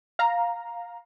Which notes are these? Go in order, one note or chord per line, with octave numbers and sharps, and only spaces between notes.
F5 A#5